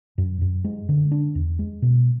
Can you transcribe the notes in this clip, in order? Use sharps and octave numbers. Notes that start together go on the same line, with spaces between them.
F#2
F#2
G#3
D3
D4
E2
G#3
B2